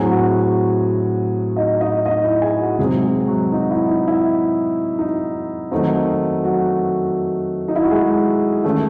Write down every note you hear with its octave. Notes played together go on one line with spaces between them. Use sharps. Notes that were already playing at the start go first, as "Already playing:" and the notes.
Already playing: A2 F#3 C4 G#4 G#5
F#4 F#5
D#4 D#5
D#4 D#5
D#4 D#5
E4 E5
G#4 G#5
F#4 F#5
C3 F#3 G#3 C4 G#4
G#3 G#4
F#3 F#4
D#4
E4
D#4
E4
D#4
D#3 F#3 A3 C4 D#4
D#4
F#3 F#4
D#4
E4
F#4
G#3 G#4
D#3 A3 C#4 A4